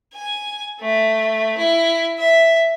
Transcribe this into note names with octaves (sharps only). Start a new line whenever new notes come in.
G#5
A3
E4
E5